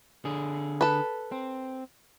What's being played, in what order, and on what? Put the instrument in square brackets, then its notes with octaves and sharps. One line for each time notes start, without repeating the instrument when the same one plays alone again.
[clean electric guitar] D3 G#4
[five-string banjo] A4 B4
[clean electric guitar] C4